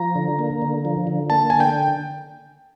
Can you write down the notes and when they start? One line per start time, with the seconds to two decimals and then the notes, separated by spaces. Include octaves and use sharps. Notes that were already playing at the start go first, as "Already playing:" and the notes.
Already playing: F3 A#5
0.16 D3
0.39 A#3
0.62 D3
0.85 F3
1.07 D3
1.30 A#3 A5
1.50 D3 G#5
1.60 G5